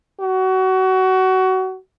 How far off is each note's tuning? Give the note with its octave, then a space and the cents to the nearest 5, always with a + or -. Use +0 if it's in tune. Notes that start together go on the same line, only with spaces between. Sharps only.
F#4 +25